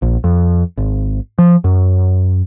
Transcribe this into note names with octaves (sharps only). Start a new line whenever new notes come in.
A#1
F2
G#1
F3
F#2